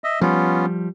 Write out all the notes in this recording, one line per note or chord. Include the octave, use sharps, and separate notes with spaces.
D#5 E5
F3 G3 B3 C#4 F4